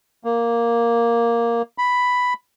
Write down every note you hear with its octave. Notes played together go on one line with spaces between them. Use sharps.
A#3
B5